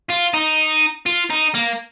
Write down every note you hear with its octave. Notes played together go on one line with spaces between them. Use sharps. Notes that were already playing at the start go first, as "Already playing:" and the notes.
F4
D#4
F4
D#4
A#3